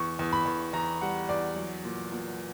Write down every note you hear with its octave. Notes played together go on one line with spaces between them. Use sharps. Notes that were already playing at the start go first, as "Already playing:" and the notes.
Already playing: E2 C#6
E2
B5
E2
E2 A#5
G3 F#5
E2 D5
F#3
A#2
A#2